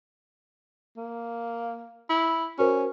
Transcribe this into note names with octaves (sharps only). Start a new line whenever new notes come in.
A#3
E4
C#4 F#4 A#4 C5